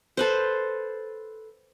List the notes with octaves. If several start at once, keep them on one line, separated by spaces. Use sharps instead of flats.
A4 B4 C5